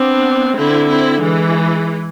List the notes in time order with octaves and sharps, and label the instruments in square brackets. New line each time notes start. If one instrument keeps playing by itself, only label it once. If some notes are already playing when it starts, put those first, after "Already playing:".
Already playing: [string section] B3 D4 [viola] C4
[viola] D3 [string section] C4 E4
[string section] C4 E4
E3 G#3